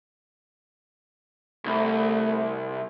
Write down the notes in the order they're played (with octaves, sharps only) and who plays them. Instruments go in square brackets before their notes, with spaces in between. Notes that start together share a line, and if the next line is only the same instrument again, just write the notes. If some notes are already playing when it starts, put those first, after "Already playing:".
[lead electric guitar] C2 [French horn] A3